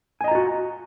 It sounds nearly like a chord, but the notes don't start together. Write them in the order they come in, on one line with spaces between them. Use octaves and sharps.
G#5 D#5 A#5 F4 F#4